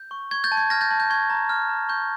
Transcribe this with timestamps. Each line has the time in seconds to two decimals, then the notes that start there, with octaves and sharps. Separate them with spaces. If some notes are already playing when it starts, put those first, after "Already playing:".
Already playing: G6
0.11 C#6
0.31 C#6 G#6
0.44 G6 A6
0.52 A5
0.57 G#6
0.70 F6 G#6 A#6
0.81 G6 A6
0.91 A5
1.00 G6
1.10 C#6 G#6
1.30 A#5
1.49 F6
1.69 A#5
1.89 C#6 G6